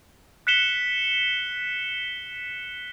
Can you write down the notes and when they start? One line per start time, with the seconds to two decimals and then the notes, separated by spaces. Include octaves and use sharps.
0.47 F#6 B6 C#7 E7 G7